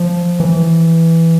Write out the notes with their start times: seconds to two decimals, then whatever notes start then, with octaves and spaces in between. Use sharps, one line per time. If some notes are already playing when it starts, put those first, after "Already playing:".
Already playing: F3
0.40 E3